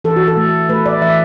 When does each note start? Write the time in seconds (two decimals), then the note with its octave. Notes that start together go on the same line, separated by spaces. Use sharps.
0.04 E3 A4
0.16 F#4
0.28 A4
0.37 A3
0.69 A3 B4
0.86 D5
1.02 E3 E5